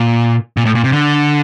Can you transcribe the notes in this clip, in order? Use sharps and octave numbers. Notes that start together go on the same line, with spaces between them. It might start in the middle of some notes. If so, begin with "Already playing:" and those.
Already playing: A#2
A#2
A2
A#2
C3
D3